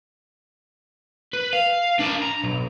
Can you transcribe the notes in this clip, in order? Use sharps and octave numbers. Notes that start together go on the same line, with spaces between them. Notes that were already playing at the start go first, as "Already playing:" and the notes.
B4
F5
D4 A#4
A#5
B1